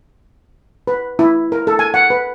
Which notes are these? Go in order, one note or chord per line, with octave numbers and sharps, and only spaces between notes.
B4
E4
A#4
A4
G#5
F#5
B4